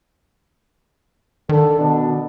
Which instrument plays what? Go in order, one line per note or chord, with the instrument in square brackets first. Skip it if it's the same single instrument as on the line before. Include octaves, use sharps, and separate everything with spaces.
[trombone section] D3 A4 [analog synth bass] D#3
[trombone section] B2 D4